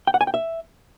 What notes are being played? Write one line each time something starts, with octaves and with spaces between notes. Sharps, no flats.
G5
F#5
G#5
G5
E5